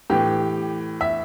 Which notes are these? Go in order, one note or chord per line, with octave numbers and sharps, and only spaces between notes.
A2 E3 G4
E5